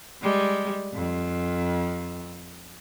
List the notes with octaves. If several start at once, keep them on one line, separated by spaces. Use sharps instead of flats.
G3 G#3
F2